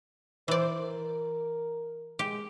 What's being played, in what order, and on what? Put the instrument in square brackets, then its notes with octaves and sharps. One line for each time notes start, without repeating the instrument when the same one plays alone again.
[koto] E3 D5 [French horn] C5
[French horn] A#4
[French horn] G#3 [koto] G4